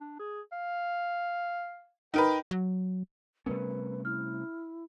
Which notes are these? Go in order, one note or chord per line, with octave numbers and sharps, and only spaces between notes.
D4
G#4
F5
D#4 A#4 B4 G5
F#3
C3 G3 A3 B3 C#4 A#4 B4
E4 F6